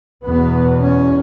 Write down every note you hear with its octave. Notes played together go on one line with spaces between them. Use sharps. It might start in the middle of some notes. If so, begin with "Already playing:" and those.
E2 B2 B3
C#4